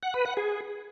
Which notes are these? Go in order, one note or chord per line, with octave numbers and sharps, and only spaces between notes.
F#5
B4
F#5
G#4